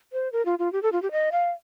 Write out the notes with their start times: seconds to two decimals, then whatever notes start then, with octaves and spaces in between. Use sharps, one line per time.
0.13 C5
0.32 A#4
0.45 F4
0.59 F4
0.73 G4
0.83 A4
0.92 F4
1.02 G4
1.12 D#5
1.32 F5